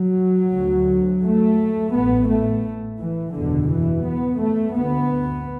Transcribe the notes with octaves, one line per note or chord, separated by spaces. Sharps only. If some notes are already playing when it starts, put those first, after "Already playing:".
Already playing: F#3
D2
A3
A1 A2 B3
A3
E3
F#1 E2 B2 D3
E3
B3
A3
D2 B3